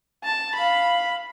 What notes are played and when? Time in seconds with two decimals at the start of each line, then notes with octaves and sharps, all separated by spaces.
0.24 A5
0.55 F5 B5